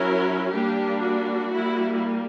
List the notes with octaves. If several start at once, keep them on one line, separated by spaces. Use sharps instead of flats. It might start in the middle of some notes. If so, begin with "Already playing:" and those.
Already playing: F#3 C#4 E4 A#4
G3 A#3 D4 G4
F#4
G3 A#3 E4